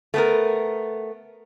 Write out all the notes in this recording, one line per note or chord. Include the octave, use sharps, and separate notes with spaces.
A3 B3 A#4